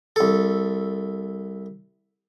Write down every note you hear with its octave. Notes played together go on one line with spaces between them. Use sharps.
C2 A4